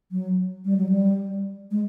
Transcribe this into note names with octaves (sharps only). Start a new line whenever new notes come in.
F#3
G3
F#3
G3
G#3